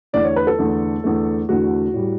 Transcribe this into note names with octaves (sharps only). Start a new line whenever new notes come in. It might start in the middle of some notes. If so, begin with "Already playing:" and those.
E2 D3 A3 D5
C#5
B4
A4
E2 D3 A3
E2 D3 A3
E2 D3 A3 F#4
A2 G3